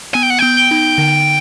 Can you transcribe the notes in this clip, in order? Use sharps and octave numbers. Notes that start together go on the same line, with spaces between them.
B3 G#5
G5
F#5
B3 G5
D#4
D3